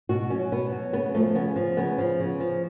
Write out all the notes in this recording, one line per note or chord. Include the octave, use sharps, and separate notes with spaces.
B2 F#4
F#3 C#4
B2 B3
F#3
C#3 B3
F3 A3
C#3 B3
F3
C#3 B3
F3
C#3
F3